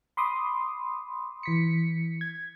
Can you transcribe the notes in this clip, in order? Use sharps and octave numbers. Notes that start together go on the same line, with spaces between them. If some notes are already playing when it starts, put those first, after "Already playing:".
B5 C6 D6 D#6
E3 B6 C#7
G#6